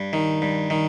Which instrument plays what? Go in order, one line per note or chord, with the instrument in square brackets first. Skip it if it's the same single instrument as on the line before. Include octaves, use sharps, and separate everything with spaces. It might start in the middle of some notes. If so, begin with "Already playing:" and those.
Already playing: [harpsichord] G2
D#3
G2
D#3